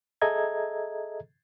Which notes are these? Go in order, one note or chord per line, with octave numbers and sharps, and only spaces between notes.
G#4 A4 D#5 E5 A#5 G#6